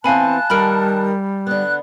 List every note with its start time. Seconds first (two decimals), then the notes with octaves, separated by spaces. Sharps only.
0.04 E3 B3 C4 F5 G#5 A5 B5 F#6
0.50 D#3 G3 A4 A#4 B5 F6 D7
1.47 D3 B3 F#6